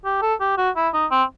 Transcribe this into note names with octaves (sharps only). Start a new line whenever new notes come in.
G4
A4
G4
F#4
E4
D#4
C4